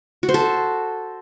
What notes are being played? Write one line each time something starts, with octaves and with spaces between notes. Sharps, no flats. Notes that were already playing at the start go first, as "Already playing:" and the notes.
F#4
C5
A4